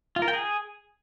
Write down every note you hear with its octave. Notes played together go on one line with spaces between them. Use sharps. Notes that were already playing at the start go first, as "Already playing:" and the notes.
F4
A#4
G5
G#4